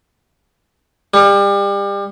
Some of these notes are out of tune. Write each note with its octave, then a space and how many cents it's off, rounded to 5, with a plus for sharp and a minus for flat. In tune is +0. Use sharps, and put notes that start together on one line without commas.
G3 +30